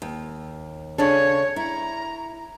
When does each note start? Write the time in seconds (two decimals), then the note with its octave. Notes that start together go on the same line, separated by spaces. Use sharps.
0.02 D#2
0.98 C#3 D4 A4 C#5
1.56 E4 A#5